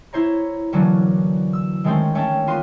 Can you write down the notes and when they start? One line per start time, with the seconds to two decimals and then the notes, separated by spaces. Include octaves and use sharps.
0.13 E4 C5 C#5 A#5
0.73 D3 E3 F#3 A3 A#3 C#4
1.53 E6
1.84 D#3 G#3 A3 C4 C#4 C5
2.15 A3 C#4 C5 C#5 G5 A5
2.47 A#3 B3 F4 C6 D#7